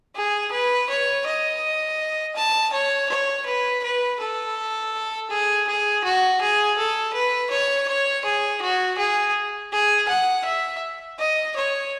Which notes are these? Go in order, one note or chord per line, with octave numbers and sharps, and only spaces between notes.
G#4
B4
C#5
D#5
A5
C#5
C#5
B4
B4
A4
G#4
G#4
F#4
G#4
A4
B4
C#5
C#5
G#4
F#4
G#4
G#4
F#5
E5
D#5
C#5